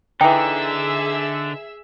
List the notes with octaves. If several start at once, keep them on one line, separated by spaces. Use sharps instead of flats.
D3 E3 D#4 G#4 E5 G5 E6